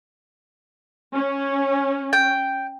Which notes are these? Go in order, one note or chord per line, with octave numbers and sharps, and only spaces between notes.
C#4
G5